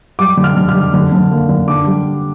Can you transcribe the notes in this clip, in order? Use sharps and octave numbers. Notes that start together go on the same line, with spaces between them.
G3 D6
D3
F6
D3
F6
G3
D3
D3
A#3
D3
D4 D6
G3